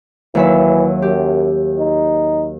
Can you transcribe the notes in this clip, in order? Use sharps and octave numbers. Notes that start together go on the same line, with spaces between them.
D#2 E3 F#3 E5
F#2 G4
D#4